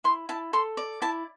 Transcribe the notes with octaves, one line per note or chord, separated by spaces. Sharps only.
E4 C6
E4 A5
A4 C6
D5
E4 A5